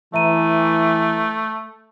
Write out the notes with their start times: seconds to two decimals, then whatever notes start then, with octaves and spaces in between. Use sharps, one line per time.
0.14 E3 A3 E5 A#5 D#7